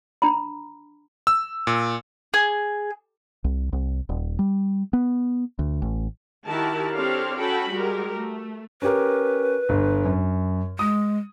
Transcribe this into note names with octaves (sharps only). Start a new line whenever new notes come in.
D4 A#5 B5
E6
A#2
G#4
C2
C2
D#1
G3
B3
D2
A1
D#3 E4 F#4 G4 A#4 A5
C4 D4 G4 A4 C#5 F5
C#4 F#4 A4 G5 A5 B5
G3 G#3 F#4 G4 A#4
A3
C#4 G4 A#4 B4
G1
F#2
G#3 D#6